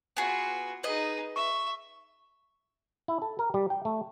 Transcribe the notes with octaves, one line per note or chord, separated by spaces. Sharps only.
B3 F4 F#4 G#4
D#4 G#4 B4 D#5
E5 C#6
E4
A4
A#4
G3
G5
A3